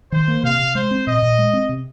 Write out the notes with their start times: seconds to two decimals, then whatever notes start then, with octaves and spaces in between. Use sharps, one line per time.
0.12 D#3 C5
0.28 A#3
0.43 C3 F5
0.59 C3
0.75 G#3 C5
0.91 C4
1.07 A#2 D#5
1.22 A#2
1.38 G#3
1.53 C4
1.69 C3